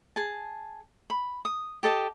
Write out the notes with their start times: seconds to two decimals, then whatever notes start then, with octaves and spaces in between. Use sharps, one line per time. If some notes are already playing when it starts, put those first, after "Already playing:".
0.16 G#4 A5
1.10 B5
1.45 D#6
1.83 G4 A4 D#5 A5